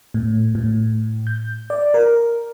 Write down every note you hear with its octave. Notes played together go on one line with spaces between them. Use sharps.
A2
A2
G6
D5
A#4